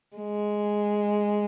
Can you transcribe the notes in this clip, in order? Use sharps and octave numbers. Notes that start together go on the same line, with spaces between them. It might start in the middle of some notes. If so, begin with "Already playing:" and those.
G#3